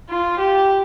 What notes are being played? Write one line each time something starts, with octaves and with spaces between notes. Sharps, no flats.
F4
G4